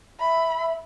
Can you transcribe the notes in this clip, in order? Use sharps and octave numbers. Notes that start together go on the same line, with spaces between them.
E5 B5